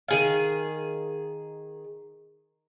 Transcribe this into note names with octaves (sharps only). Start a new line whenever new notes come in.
D#3 G#4 F5